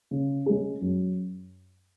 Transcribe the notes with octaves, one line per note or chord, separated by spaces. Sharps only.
C#3
G#3 C#4 G#4
F#2